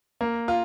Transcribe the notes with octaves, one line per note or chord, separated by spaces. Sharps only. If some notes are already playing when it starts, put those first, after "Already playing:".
A#3
F4